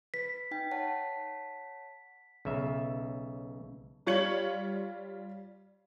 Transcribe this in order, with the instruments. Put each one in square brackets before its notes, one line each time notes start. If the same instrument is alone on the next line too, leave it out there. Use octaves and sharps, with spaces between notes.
[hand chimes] B4 [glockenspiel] B6
[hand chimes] D#4 G5
C#5 F#5 A5
[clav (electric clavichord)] B1 C#3 E5
[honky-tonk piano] G3 F4 C#5 G#6 C#7 F#7